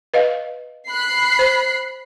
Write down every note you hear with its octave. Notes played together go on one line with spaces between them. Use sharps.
B4 D#5 F5
B5 F#6 C7
C5